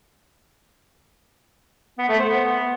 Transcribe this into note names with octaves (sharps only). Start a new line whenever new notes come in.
B3
A3
C5
B3